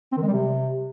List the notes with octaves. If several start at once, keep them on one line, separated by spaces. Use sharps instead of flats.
C4
D#3
G#3
G3
C3